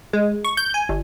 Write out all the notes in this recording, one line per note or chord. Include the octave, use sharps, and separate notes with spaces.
G#3
C#6
G6
G#5
G1